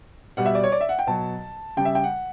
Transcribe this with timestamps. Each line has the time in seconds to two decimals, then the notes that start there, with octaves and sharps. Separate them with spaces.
0.37 B2 G3 F#5
0.46 E5
0.55 D5
0.64 C#5
0.72 D5
0.81 E5
0.89 F#5
0.99 G5
1.07 B2 F#3 A5
1.77 C#3 G3 G5
1.85 E5
1.95 G5
2.04 F#5